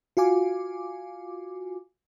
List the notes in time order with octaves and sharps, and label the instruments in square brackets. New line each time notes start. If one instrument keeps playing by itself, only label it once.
[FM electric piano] F4 F#4 F5 G#5 D6